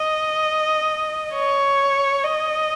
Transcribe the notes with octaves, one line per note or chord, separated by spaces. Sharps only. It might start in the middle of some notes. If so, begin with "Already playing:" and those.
Already playing: D#5
C#5
D#5